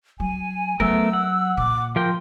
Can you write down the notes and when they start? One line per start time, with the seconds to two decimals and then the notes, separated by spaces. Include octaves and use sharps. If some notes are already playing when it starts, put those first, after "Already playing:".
0.20 F#3 G#5
0.80 F#3 A3 B3 A#4 E6
1.13 F#5
1.57 A#2 D6
1.96 F3 A#4 G5 C6